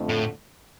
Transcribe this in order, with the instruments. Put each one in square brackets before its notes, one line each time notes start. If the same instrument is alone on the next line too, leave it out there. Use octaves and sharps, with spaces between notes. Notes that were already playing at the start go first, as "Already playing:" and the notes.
Already playing: [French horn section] F2 D3 A3
[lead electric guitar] A2